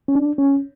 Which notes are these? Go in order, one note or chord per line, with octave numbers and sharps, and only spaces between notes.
C#4
D4
C#4